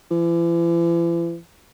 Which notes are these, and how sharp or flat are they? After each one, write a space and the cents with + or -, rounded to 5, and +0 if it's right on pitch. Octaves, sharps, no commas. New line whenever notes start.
E3 +40